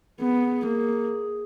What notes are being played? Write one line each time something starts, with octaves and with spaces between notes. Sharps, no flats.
B3 G#4
A#3